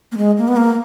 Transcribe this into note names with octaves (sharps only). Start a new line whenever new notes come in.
A#3
G#3
A#3
B3
A#3